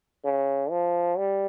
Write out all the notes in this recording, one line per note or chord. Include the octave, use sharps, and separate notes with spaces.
C#3
F3
G3